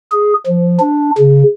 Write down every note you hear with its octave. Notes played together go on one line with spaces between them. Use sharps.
G#4
F3
D4
C#3